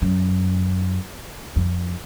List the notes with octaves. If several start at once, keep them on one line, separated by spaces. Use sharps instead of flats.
F#2
F2